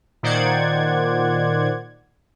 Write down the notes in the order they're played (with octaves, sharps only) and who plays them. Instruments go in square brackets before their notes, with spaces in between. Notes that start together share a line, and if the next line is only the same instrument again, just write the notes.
[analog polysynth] A#2 D#3 C5 D5 F#5 G#6